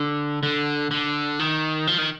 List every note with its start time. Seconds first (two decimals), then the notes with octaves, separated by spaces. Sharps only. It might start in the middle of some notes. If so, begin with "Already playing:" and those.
Already playing: D3
0.43 D3
0.91 D3
1.39 D#3
1.87 F3
1.98 D#3